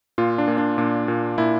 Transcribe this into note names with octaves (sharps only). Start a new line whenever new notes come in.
A#2 F4
D4
A#2
D4
A#2 D4
A#2
A#2 E4